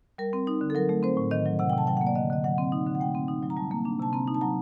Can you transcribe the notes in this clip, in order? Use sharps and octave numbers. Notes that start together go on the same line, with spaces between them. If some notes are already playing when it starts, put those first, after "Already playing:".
G3 A#4
C4
D#4
D3
A4
F#3 A#4
A3
C4 C5
A2
D#3 D#5
F#3
C3 F#5
G5
C3 A5
F#3 G5
F#5
A#3
D5
D3 D#5
D3 D#5
F#3 F#5
C4
D#4
D3
F#5
A3 G5
C4
D#4
F#3
A#5
G3 A5
A#3
D4
C3 A5
C4 A#5
D#4
A5
F#3 A#5